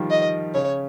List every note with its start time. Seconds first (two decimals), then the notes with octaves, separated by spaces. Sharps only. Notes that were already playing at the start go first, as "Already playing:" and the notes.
Already playing: D#3 F3 G3
0.11 D#5
0.54 C#3 C#5